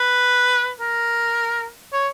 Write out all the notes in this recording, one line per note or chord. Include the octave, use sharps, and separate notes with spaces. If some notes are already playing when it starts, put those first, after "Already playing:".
Already playing: B4
A#4
C#5